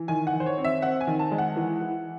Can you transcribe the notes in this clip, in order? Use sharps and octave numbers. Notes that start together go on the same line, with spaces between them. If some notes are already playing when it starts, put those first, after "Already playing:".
Already playing: E3
D#3 G#5
F#5
D#3
C5
C#5
C4
E5
C4 F#5
G#5
D#3
A5
G#3
F#5
E3
E3